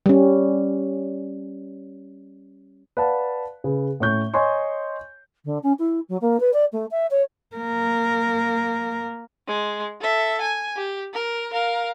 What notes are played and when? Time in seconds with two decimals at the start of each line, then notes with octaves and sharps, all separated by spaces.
0.06 G3 C#4
2.97 B4 D5 F5 F#5 A5
3.64 C#3 B4
4.00 A2 C#4 C#6 G6
4.34 C#5 D#5 G#5 C6 C#6
5.45 D3
5.63 C#4
5.79 E4
6.09 F#3
6.21 A#3
6.40 B4
6.53 D5
6.72 A3
6.91 E5
7.11 C#5
7.56 A#3 A#4
9.47 G#3
10.01 A4 E5
10.41 G#5
10.76 G4
11.13 A#4
11.52 A#4 F5